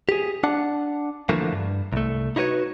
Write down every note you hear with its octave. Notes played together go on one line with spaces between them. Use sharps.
G4 G#4
D4 F#5 A5
D3 E3 F3 A3 A#3
G2
C2 A3
D#4 E4 F#4 B4 C#5